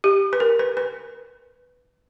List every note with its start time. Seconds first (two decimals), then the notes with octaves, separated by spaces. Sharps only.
0.04 G4
0.33 B4
0.40 A#4
0.59 B4
0.77 B4